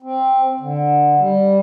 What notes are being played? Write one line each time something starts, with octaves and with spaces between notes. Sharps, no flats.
C4
D3
G3